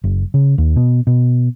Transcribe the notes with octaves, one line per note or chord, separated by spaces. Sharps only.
F#1
C#3
D#2
B2
B2